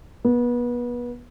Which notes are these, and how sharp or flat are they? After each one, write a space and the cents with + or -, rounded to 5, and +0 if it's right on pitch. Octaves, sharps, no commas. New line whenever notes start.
B3 -30